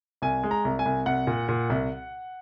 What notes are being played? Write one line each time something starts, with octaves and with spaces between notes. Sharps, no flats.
C2 G#5
G#3
A#5
C2
G#5
C2
C2 F#5
A#2
A#2
C2